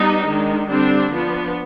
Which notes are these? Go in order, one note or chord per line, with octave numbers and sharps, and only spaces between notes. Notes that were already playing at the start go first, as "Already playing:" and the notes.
Already playing: G3 B3 D4 D#4
D#3 G#3 D4
D3 G3 C4 D4
F3 B3 D4